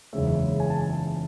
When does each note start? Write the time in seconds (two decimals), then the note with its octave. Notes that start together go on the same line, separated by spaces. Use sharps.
0.13 F#1 E2 C#3 G#3 C#5 E5
0.60 G#5
0.70 A5